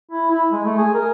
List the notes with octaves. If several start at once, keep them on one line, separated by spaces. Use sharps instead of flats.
E4
E4
G#3
A3
G#4
A#4